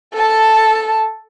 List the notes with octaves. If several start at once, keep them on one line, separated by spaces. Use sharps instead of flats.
A4 A5